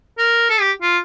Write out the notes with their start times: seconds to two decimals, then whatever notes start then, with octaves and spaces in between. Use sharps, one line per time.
0.18 A#4
0.49 A4
0.60 G4
0.82 F4